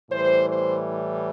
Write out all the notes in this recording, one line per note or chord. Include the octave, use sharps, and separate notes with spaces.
A2 E3 G3 C5
C5